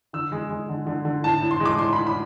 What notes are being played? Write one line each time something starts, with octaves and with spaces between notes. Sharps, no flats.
D3 E6
G#3
G#3
D3
D3
D3
A2 A5
A2
C6
G#3
D6
A2 C6
A2 B5
B5